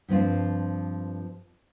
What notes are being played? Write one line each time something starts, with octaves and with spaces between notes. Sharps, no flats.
G2 F3 C4 F4